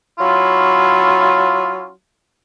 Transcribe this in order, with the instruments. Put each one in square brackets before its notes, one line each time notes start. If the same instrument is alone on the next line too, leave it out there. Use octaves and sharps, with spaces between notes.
[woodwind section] F#3 C#4 E4 F4